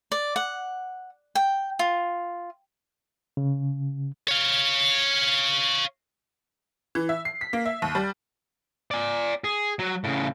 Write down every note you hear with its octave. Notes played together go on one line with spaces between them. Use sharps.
D5
F#5
G5
F4
C#3
C#5 F5
E3
E5
C7
B6
A#3
E5
D#2
G3
D5 G#5
G#4
F#3
A2 C#3